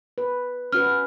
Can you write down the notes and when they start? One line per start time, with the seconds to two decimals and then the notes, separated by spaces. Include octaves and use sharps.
0.18 B4
0.73 C#4 F#4 B4 F6